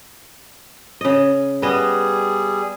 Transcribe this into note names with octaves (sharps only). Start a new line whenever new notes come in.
C#3 D#5
G3 B3 G#4 D#5